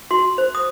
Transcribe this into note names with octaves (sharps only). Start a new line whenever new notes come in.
F#4 C6
C5
D#6